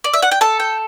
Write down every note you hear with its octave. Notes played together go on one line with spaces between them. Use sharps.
D5
E5
F#5
G5
A4 A5
G5